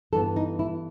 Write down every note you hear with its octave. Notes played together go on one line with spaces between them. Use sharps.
G2 E3 B3 A4
D#4
E4